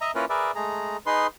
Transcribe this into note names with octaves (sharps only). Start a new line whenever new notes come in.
D#5 E5 A#5
A#3 C#4 E4 F4 A#4 B4
G#4 A#4 B4 D5 E5
G#3 A3 G#4 A#5
D#4 G#4 B4 C6